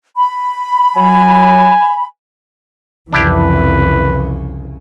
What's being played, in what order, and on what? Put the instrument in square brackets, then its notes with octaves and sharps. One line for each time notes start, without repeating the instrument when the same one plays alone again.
[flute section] B5
[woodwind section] F#3 [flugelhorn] G#5
[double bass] C2 C#3 [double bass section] F2 E3 [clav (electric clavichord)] D4 E4 G4 [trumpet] B4